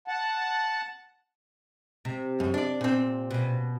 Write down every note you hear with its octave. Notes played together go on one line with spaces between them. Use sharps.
F#5 A5
C3
F#2
D4 D5
A#2 C4
B2 C#4